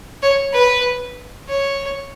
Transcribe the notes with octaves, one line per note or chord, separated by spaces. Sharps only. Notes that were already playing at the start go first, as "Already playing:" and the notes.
C#5
B4
C#5